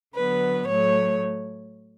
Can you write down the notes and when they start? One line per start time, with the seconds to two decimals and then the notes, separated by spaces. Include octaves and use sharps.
0.15 D3 F#3 B3 B4
0.68 A2 F#3 A3 C#5